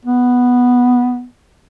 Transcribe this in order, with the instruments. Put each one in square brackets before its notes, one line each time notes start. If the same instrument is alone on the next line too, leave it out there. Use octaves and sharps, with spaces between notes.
[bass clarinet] B3